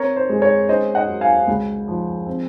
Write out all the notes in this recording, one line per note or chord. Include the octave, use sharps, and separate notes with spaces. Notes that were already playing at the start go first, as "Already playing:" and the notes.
Already playing: C4 A#4 C#5
C5
G#3
A#4 C#5
C#4 C5 D#5
D#5 F#5
F#3
F5 G#5
C#2
F3
C4